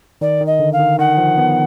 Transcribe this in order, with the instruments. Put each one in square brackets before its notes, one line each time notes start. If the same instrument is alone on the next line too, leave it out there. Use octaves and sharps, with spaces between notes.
[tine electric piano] D#3 [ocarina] D5
[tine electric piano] D#3
[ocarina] D#5
[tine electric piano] D3
[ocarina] F5
[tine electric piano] D#3
[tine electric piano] D#3 [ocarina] F#5
[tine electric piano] F3
B3